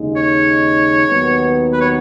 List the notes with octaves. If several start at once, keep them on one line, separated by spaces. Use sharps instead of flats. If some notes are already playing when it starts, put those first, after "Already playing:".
Already playing: D#2 C#3 G#3 D#4
C#5
D#2 D#3 F#3 B3
B4
C#5